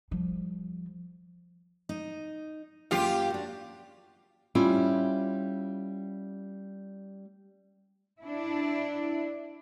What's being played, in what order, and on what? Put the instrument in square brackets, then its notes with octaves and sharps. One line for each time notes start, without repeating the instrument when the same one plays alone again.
[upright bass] F3 G3
[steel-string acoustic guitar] D#4
[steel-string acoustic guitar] F#2 A#3 [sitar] F4 G4
[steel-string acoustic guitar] D4 F#4
[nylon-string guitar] G3 C#4 E4 F4
[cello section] D4 E4